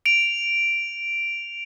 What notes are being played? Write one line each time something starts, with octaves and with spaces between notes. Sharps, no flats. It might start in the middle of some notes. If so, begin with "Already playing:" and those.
D7 F7